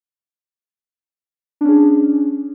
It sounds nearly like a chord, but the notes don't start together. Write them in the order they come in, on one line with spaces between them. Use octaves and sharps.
D4 C#4 G#4